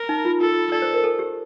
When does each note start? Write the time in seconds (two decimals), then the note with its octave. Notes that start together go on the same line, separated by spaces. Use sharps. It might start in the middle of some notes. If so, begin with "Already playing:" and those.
Already playing: A#4
0.09 D#4
0.25 F4
0.41 F4 A4
0.72 A4 D5
0.82 C5
0.94 A#4
1.04 A4
1.19 G4